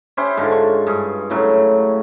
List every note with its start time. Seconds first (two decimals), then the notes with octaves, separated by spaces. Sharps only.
0.17 C#4 E4 G4 C5
0.37 G#2 D3 F4
0.51 C#6
0.87 G2 G#4
1.30 A2 C#3 F#3